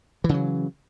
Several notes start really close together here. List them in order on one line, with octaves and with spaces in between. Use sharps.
E3 C#3 F#3